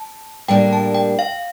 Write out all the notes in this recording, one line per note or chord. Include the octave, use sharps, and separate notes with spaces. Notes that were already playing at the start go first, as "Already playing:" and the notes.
Already playing: A5
A2 G3 A#3 D4 G5
A5
G5
F5